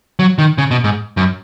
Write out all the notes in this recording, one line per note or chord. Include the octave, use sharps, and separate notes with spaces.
F#3
D#3
C#3
B2
G#2
F#2